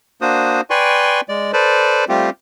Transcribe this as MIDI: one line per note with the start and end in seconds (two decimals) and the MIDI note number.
0.21 0.61 58
0.21 0.61 62
0.21 0.61 66
0.21 0.61 72
0.21 0.61 87
0.70 1.21 71
0.70 1.21 74
0.70 1.21 79
0.70 1.21 80
0.70 1.21 84
0.70 1.21 85
1.29 1.52 56
1.29 1.52 74
1.53 2.05 69
1.53 2.05 71
1.53 2.05 72
1.53 2.05 74
2.09 2.30 55
2.09 2.30 57
2.09 2.30 60
2.09 2.30 65
2.09 2.30 67